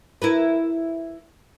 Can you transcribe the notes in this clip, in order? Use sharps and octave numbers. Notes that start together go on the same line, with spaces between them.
E4 A#4 B4